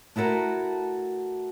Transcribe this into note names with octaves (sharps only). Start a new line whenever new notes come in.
A3 E4 F#4 A4 A#4